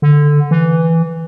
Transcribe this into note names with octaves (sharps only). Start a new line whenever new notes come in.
D3
E3